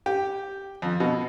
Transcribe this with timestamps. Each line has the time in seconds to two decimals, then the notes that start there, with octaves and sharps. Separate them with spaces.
0.06 G4
0.82 F2
1.00 B2